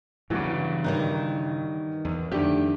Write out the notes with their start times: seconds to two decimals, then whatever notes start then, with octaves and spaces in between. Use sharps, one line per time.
0.30 E2 G2 C#3 E3 F#3 B3 D6
0.84 D#3 G3 D#4 B4 C#5 F#6
2.05 E2
2.32 F2 D3 D#3 A3 D4 G4